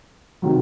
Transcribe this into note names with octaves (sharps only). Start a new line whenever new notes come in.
C3 D#3 F#3